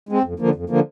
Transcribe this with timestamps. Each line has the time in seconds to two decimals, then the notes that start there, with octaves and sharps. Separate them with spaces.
0.09 G#3 C4
0.24 F2
0.39 D3 F3 A#3
0.55 F2
0.69 D3 F3 A#3